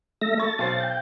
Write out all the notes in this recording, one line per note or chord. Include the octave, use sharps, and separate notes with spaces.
A3 E5 A#6
A4 C#6 A6
B1 C5
G5